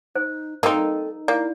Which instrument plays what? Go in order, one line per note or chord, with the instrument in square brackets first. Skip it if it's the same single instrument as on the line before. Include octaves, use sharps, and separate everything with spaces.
[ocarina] D#4 [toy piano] C5
[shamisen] A#3 C4 [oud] D#4 [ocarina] A4 [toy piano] A#4
[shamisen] A#3 [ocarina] E4 [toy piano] D5